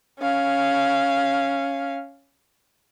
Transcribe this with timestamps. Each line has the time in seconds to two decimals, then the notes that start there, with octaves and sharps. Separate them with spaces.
0.20 C#4 F5